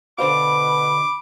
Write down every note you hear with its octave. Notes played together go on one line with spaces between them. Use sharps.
B2 D3 C5 F5 B5 D6